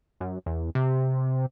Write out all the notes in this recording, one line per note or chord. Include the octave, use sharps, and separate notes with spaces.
F#2
E2
C3